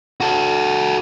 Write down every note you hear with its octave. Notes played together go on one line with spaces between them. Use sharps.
F#4 A4